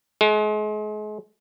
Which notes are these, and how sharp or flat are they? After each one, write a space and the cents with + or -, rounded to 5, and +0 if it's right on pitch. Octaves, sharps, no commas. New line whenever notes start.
G#3 +35